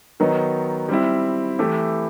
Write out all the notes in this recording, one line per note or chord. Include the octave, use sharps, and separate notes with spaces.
D#3 F#3 B3 D#4
G3 C4 E4
E3 A3 E4 G4